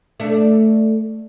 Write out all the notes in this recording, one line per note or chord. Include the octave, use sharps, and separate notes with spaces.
A3 D4